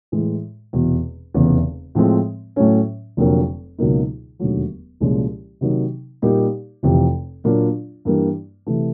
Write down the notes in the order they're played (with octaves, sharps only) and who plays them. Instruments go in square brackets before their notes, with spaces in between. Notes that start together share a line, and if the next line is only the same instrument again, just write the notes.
[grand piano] A2 E3 G#3
F1 E2 B2
F1 E2 C#3 E3
A2 F3 G#3 C4
A2 F#3 A3 C#4
F1 F2 D3 F#3 A#3
C#2 B2 F#3 A#3 D#4
E1 D#2 D3 F#3 A3
C2 A#2 F3 G#3 C#4
C3 D#3 F#3 A#3 D#4
A#2 G3 A#3 D#4 G4
F1 F2 C3 E3
A#2 F#3 A#3 D4 F4
G2 E3 G3 A#3
C3 E3 A3